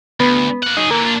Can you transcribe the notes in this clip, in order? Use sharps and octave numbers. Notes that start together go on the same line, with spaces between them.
D2 B3
A#3 F#5
F#3 D#4 G#4
D3 E3 A#3
D4 F4